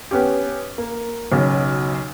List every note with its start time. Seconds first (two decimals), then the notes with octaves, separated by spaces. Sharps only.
0.11 B3 C#4 G4
0.78 A#3
1.32 B1 C#3